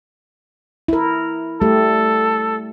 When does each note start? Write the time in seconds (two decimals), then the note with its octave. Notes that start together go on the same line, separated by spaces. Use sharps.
0.88 E4 A#4
1.61 G3 A3 G4 A4